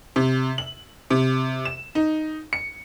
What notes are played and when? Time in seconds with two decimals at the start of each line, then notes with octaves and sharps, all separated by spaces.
0.16 C3
0.58 F#7
1.11 C3
1.65 E7
1.95 D#4
2.53 C#7